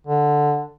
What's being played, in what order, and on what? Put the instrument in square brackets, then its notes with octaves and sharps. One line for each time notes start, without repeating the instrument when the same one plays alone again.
[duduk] D3